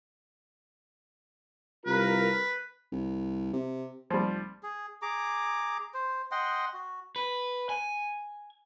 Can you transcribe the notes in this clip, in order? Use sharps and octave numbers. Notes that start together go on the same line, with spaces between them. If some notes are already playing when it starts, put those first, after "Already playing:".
C2 F4 A#4 B4
C2
C3
F1 F3 G3
G#4
G#4 A#5 D6
C5
D#5 F#5 G5 C6
F#4
B4
G#5